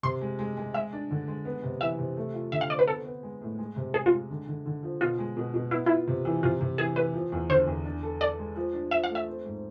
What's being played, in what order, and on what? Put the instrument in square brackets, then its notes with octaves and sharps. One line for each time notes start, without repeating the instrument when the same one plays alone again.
[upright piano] C3 [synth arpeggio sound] C6
[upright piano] G#3
G#3
G#3
[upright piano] G#3 [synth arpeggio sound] E5
[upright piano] D4
D3
G#3
B3
C3
[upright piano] E3 [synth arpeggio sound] E5
[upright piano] C3
A3
F4
[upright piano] D3 [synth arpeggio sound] E5
[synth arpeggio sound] F5
[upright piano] C4 [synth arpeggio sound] D5
[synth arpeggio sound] B4
[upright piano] B3 [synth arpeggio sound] A4
[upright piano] B3
G#3
A2
G#3
C3
[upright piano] G#3 [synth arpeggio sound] G#4
[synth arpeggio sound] F4
[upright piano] G#3
D3
D3
D3
F3
[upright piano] B2 [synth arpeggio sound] F4
[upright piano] G#3
B2
B2
[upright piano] B3 [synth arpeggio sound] E4
[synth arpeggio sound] E4 [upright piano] F4
[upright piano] C3
E3
[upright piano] C3 [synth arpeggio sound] F4
[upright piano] C3
[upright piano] E3 [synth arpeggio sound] G#4
[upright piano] E3 [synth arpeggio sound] B4
[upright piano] F3
E2
[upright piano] D3 [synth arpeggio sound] C5
[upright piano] E2
D4
A4
[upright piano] A4 [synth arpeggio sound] D5
[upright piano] G#3
F3
D4
[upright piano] F3 [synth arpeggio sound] E5
[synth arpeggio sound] F5
[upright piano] A3
[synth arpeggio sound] E5
[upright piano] C4
G#2